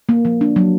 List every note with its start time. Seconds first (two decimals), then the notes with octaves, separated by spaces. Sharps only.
0.09 A#3
0.25 F3
0.41 D4
0.56 F#3